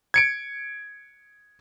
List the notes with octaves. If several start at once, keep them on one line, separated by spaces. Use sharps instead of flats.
G#6 C#7 D7